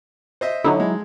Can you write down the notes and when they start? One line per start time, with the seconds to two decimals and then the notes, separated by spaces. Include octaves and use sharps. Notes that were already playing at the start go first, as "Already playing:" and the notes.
0.41 C5 D#5 E5
0.64 D3 F#3 D#4 E4
0.80 G#3